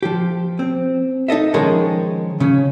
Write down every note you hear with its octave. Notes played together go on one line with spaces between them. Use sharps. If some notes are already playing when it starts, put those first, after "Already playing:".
F3 G4
C4
D#4 A4 D#5 E5
D#3 F3 G#3 C#4 G#4 A#4
C#3 C#4